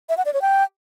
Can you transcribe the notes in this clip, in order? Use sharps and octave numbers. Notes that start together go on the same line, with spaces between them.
E5
F#5
D5
C#5
G5